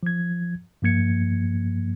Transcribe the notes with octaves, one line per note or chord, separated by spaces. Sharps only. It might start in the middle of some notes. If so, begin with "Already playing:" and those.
F3 G#6
G2 F3 A#3 G#6 C#7